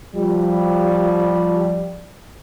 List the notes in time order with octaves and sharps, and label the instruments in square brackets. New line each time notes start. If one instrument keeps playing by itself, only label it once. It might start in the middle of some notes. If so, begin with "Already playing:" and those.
[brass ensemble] F3 G3